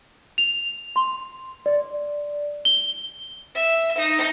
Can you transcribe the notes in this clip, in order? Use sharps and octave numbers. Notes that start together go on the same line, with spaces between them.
F7
C6
D5
G7
E5
D#4